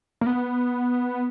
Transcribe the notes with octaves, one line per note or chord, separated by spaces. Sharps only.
A#3
B3